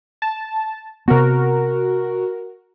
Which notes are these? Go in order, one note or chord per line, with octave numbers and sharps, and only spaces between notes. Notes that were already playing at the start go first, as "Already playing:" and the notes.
A5
C3 B3 F#4 A#4